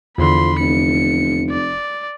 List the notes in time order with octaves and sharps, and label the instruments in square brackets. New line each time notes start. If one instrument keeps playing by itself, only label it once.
[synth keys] E2 D3 [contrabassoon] F3 [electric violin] B5 C6
[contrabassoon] F1 [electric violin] C#7
[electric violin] D5